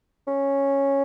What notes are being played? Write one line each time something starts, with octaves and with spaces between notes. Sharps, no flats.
C#4